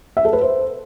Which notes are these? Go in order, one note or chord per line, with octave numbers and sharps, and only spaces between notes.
E5
A4
B4
C5